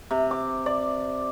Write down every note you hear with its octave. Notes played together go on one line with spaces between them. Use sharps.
C3
D6
D5